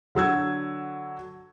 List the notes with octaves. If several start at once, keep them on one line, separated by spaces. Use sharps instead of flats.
D3 F#3 E6 G#6